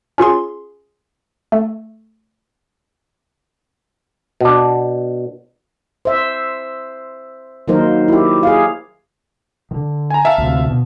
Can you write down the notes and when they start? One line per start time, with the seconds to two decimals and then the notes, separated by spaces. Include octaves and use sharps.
0.18 C#4 F4 G#4 C6
1.52 A3
4.41 B2 D4
6.05 C5 E5
7.68 D#3 F#3 A#3 D#4 A#4 C5
8.08 E4 G4
8.43 G#4 F5
9.71 D3 D#3
10.10 G#5 A#5
10.25 E5 F5 A5
10.38 D2 C3
10.69 B2